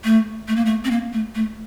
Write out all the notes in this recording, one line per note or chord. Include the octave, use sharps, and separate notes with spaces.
A3
A3
A#3
A3
C4
A#3
A3
A3